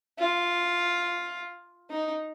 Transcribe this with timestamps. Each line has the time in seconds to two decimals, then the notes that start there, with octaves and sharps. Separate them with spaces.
0.19 F4
1.90 D#4